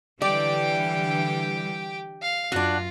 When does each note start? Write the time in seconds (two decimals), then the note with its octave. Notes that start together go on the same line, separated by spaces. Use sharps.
0.22 D3 E3 G3 G4 D5 G5
2.22 F5
2.52 F#2 D4 F4 F#4